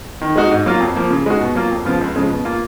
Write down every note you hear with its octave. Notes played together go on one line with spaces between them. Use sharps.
D#3
G#3 D#4 F#4
G#2
F#3 A#3 F4
F2
F3 A#3
C#3
G#3 D#4 F#4
B2
F#3 A#3 F4
F2
C#3 F3 B3 F4
C#2
C#3 F3 G#3
B2
A#3 F4